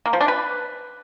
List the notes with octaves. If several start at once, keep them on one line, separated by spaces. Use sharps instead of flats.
A#3
F3
D4
B4